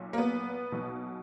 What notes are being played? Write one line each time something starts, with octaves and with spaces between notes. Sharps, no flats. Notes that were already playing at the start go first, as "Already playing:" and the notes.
Already playing: B1 A#2
A#3
B3
B1 B2